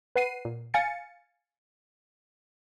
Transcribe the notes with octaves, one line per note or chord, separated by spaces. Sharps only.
B4 F#5 C7 D#7
A#2
F5 G#5 A6 C#7